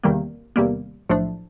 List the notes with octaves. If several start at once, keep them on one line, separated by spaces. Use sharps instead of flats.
E2 C3 D#3 G3 A#3
E2 C3 D#3 G3 A#3
B1 A2 F3 A3 D4